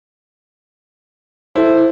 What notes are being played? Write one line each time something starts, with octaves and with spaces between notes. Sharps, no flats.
E4 A4 C5